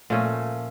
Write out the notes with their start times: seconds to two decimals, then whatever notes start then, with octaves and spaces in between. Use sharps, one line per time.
0.10 A#2 F3 A3 C#4